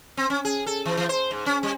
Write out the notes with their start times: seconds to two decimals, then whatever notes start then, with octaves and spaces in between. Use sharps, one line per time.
0.17 C4
0.30 C#4
0.45 G#4
0.66 A4
0.85 E3
0.97 E3
1.09 C5
1.31 G#2
1.46 C#4
1.63 G3